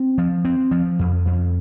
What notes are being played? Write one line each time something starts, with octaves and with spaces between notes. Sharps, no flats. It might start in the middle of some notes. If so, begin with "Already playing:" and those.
Already playing: C4
F3
C4
F3
F2
F2